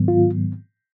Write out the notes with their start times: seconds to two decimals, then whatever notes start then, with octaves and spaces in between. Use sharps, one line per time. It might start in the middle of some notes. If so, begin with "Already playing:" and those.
Already playing: G#2 D#3 F#3 B3
0.08 F4